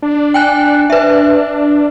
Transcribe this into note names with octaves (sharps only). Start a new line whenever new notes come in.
D4
G5 G#5 F#6
D4 B4 E5